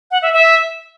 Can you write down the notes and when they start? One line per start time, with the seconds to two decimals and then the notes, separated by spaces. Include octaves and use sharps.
0.11 F#5
0.22 E5
0.33 E5